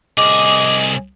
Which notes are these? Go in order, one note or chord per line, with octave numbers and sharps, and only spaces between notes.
C2 G#4 D#5 D6